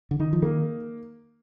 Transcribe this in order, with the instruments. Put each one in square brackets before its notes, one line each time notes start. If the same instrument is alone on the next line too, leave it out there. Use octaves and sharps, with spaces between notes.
[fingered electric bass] D3
[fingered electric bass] D#3 [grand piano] D#4
[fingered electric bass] F3
[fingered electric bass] D#3 [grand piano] A#3